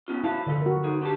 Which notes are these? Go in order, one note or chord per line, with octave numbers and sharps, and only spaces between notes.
B3 C#4 F4
E4 F#4 F5 A5
D3 F3 A4
F#4 A#4
D#4 G#4
D4 G4 A5